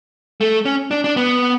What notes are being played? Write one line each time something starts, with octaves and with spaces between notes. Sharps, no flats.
A3
C#4
D4
D4
B3